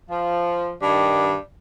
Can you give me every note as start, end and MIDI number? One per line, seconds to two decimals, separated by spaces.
0.10 0.72 53
0.82 1.35 43
0.82 1.35 51
0.82 1.42 74